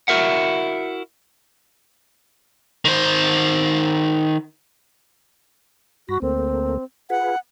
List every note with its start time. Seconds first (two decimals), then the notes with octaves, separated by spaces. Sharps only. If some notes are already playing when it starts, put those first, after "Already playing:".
0.08 E4 F#4 A#4 E5 F#5
2.85 D#3 C5
6.09 G2 F#4 B5 A#6
6.22 D2 A3 A#3 C4
7.10 F4 G#4 B4 F#5